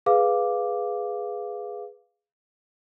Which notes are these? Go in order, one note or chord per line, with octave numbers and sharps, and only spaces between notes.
G#4 B4 F5 D6